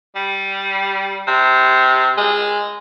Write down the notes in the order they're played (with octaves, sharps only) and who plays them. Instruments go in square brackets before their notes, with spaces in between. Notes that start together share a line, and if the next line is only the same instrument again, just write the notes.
[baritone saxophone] G3
C3
G#3